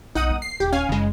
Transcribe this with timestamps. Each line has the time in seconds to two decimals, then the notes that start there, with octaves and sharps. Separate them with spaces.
0.15 B1 D#4 F#5 D#6
0.30 A#3
0.42 C7
0.60 D#1 G4
0.73 C#4 F5 G#5
0.89 F#1 C#3 G#3